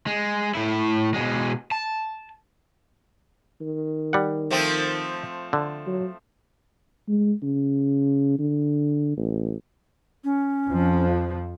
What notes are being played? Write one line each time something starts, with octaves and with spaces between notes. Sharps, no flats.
G#3
A2 E4
B2 G#3
A5
D#3
G3 F#5
F3 A3 C4
D3
F#3
G#3
C#3
D3
A1
C#4
F2 F3